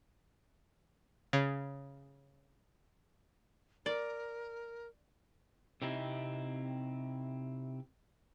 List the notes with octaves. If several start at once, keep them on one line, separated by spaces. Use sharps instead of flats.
C#3
A#4 D5
C3 C4 D#4 E4